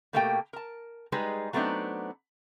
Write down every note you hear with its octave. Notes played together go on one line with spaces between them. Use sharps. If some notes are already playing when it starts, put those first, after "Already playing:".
B2 A3 A#3 G4 A4 G5
A#4 A5
G3 G#3 D#4 G#4 B4
F#3 A3 B3 C4 D4 D#4